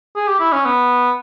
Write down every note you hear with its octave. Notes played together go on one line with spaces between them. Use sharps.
G#4
G4
E4
C#4
B3